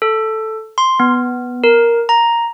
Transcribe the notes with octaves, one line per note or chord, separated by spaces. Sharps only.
A4
C6
B3
A#4
A#5